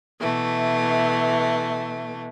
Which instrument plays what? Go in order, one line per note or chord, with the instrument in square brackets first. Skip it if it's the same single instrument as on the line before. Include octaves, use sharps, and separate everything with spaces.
[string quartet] B2 E3 A3